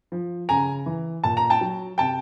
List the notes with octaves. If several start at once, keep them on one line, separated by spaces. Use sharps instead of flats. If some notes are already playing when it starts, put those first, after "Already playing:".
F3
C#3 G#5 A#5
E3
A#2 A5
A#5
G5 A5
F#3
C3 G5 A5